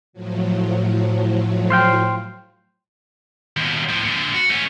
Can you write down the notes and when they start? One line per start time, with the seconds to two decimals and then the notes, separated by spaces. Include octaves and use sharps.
0.13 A2 F3 F#3
1.70 C5 F5 G5
3.57 D#2 B2
3.89 A2 F3
4.05 A#2 D3
4.34 F#4
4.50 A3 C#4